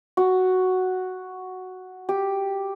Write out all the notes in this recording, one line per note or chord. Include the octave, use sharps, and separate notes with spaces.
F#4
G4